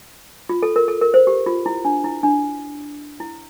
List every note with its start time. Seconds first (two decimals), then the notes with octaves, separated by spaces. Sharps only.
0.49 F4
0.63 A4
0.76 A#4
0.88 A4
1.01 A#4
1.14 C5
1.27 G4
1.46 F4
1.66 E4
1.85 D4
2.04 E4
2.23 D4
3.20 E4